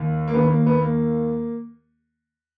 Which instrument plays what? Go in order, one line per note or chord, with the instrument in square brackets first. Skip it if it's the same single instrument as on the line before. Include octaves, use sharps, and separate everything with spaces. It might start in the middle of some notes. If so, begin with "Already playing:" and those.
Already playing: [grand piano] D#2 D#3
A#3
D#2 D#3 B3
A#3
B3
A#3